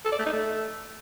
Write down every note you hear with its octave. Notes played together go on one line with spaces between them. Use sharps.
A4
D5
A3
D#4
A3